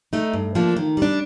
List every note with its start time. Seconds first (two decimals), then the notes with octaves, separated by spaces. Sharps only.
0.13 A3 D#4
0.33 G2
0.55 F3 A#3 D4
0.77 D#3
0.97 G3 D4